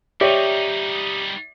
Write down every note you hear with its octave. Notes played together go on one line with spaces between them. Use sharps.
G3 D#4 G4 C#5 D5 E5